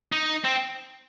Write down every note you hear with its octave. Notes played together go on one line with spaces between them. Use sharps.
D#4
C4